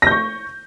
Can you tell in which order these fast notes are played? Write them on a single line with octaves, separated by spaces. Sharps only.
A#6 G6 C#6